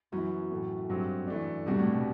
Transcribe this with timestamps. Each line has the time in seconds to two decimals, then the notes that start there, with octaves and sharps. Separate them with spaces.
0.12 F#2 E3 B3 E4
0.51 A2 E3 A3
0.89 G2 F#3 A3 C4
1.27 E3 A3 D4
1.66 E2 G2 C3 G3 D4 F#4
1.79 A2
1.92 B2